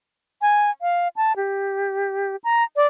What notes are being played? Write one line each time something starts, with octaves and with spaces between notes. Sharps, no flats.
G#5
F5
A5
G4
A#5
D5